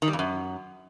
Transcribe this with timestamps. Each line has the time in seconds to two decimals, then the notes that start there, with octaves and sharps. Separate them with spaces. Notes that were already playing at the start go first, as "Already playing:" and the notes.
0.02 D#3
0.08 G3
0.13 F2
0.19 F#2